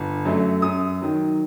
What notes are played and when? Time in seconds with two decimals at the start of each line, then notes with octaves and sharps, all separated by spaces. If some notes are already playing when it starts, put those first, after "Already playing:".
Already playing: G1
0.25 F#2 F#3 A3
0.62 F#2 D#6
1.01 D#3 F#3